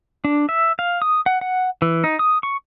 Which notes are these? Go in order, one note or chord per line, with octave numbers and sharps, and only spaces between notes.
D4
E5
F5
D#6
F#5
F#5
E3
D#4
D#6
C#6